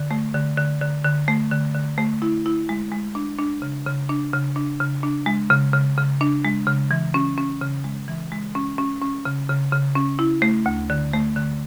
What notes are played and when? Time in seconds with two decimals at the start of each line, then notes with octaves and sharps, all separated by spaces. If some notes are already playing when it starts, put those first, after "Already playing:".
Already playing: D3
0.11 A3
0.34 D3
0.58 D3
0.81 D3
1.05 D3
1.28 A3
1.51 D3
1.75 D3
1.98 A3
2.22 E4
2.46 E4
2.69 G#3
2.92 G#3
3.15 D4
3.39 D4
3.62 C#3
3.86 C#3
4.09 D4
4.33 C#3
4.56 D4
4.80 C#3
5.03 D4
5.26 G#3
5.50 C#3
5.73 C#3
5.98 C#3
6.21 D4
6.45 G#3
6.67 C#3
6.91 E3
7.14 C#4
7.38 C#4
7.61 C#3
7.84 G#3
8.08 E3
8.32 G#3
8.55 C#4
8.78 C#4
9.02 C#4
9.25 C#3
9.49 C#3
9.72 C#3
9.95 C#4
10.19 E4
10.42 A3
10.66 D2
10.90 D3
11.13 A3
11.36 D3